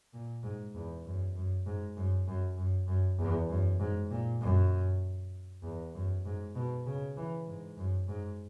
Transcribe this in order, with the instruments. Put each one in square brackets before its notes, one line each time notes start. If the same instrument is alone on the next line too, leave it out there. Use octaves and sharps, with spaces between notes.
[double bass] A#2
G#2
E2
F#2
F#2
G#2
F#2
F#2
F#2
F#2
E2
F#2
G#2
A#2
F#2
E2
F#2
G#2
B2
C#3
E3
G#2
F#2
G#2